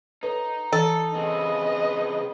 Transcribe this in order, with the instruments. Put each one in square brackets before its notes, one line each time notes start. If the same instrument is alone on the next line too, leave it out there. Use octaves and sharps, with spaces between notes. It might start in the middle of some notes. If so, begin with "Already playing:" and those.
[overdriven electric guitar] D#4 [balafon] A4 B4 C#5
[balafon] E3 [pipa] A4
[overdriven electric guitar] C#3 C4 [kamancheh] B4 D#5